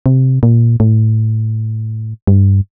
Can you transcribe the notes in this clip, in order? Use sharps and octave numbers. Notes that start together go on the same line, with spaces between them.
C3
A#2
A2
G2